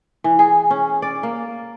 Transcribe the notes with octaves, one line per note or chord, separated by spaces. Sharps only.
E3
G#4
C#4
D5
A#3